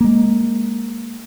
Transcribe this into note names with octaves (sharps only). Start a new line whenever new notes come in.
G#3 A#3